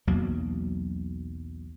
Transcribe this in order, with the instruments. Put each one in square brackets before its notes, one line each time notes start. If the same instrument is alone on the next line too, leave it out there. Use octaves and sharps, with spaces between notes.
[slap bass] B1 E2 F#3 A#3